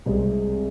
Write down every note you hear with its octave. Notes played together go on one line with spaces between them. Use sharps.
C2 C3 G#3 C4 G#4